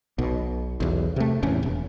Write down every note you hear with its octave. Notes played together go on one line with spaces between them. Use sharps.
B1 B2
B1 E2
C3 A3
F1 E2 A2 C#4
E1